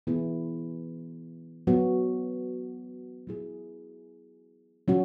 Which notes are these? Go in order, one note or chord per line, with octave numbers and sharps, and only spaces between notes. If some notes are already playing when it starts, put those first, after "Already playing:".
E3 B3 E4 G#4
F#3 B3 F#4
F#3 E4 G#4
F#3 C#4 F#4